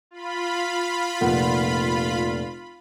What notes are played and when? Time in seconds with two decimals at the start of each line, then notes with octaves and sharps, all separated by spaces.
0.11 F4 B5
1.21 F1 A#2 F#5